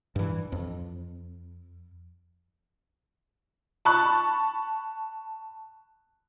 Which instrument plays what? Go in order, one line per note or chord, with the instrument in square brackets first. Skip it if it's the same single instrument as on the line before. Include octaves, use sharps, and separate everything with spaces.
[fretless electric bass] G2 E3
F2
[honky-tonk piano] A5 B5 C#6 F#6